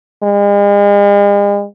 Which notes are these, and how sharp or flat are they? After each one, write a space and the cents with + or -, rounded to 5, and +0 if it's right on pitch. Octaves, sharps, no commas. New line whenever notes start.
G#3 -45